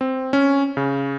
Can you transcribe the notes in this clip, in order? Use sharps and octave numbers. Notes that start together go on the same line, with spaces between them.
C4
C#4
C#3